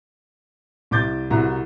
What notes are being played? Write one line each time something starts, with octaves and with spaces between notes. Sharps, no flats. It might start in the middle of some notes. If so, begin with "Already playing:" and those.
C2 E4 D6 G6 A6
C2 E4 F#4 A#5